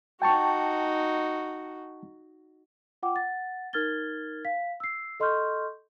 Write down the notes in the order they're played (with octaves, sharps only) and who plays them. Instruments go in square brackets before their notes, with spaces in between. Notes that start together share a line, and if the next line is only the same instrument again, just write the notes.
[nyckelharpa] D#4 F#4 [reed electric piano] G5 A5 C#6
[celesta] F4 F#5 G5 D6
F#5 A6
D#4 A#4 F6 G#6 A6 G7
F5 B6
E6 C7
A4 D#5 C6 C#6 F6 G6